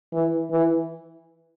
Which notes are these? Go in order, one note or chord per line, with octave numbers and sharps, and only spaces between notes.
E3
E3